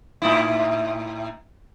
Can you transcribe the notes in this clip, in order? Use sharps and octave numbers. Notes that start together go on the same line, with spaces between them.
A2 D#4 E4